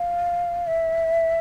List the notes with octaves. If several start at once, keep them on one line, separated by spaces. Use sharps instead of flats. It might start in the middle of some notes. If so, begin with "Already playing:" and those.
Already playing: F5
E5